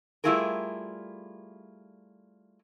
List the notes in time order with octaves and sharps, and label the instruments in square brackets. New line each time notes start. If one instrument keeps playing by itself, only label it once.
[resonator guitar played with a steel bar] G3 A3 E4 F4 G#4 A#4